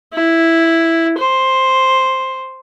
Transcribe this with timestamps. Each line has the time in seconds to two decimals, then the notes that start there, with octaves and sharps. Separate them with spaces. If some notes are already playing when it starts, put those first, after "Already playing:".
0.14 E4
1.18 C5